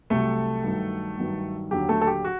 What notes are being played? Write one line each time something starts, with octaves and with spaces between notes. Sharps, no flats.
C2 C3 F#3 A3 A4
G2 D#3 F#3
G2 D#3 F#3
D#2 D3 F#3 G4
A3 A4
A4
G4
F#4